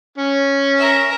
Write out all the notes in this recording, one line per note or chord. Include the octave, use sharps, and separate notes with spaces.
C#4
A#4 E5